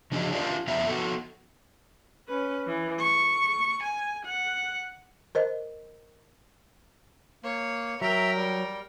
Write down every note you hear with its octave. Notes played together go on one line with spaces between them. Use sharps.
C#3 F3 D4 F#4 G#4 D#5
D4 F4 G4 A#4 D5 F5
F2 E3 B3 G4 E5 A#5
B3 F#4 A4
C#4 B4
E3
C#6
G#5
F#5
A#4 C5 D#5
A#3 C#5
F#3 A#4 E5 G5 A#5
G3